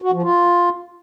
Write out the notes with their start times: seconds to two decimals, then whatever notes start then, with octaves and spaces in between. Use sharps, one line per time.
0.02 F#4
0.12 F3
0.23 F4